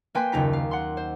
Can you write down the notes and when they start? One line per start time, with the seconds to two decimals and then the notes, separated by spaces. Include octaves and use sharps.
0.15 A#3 B4 G5 G#5 C6 B6
0.32 F#1 D#2 D#4 F4 A#5 B6
0.53 F5
0.71 F#5 C6
0.97 C5